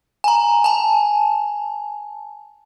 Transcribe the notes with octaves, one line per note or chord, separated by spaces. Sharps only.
G#5 A#5
G#5 A5